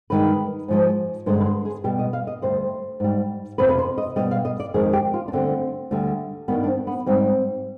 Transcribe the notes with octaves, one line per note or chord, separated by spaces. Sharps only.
G2 D#3 G#3 B4
G#2 F3 G#3
G2 D3 G#3 C5
B4
C5
G#4
B2 G3 G4
D#5
F5
D#5
D2 C3 G3 C5
G#2 G3
F2 C3 F3 B4
B4
C5
D#5
B2 G3 D#5
F5
D#5
D5
F2 D#3 G#3 G#4
G4
F4
D4
D2 D3 G3 C4
D2 D3 G3
G2 D#3 G3 B3
D4
C4
B3
G#2 G3 C4